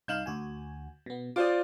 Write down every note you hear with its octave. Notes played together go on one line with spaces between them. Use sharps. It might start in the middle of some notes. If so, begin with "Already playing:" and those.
C2 D#4 F5 G6 E7 F#7
D2 F#4 G#5
B2 B3
F4 C5 D5 D6 D#6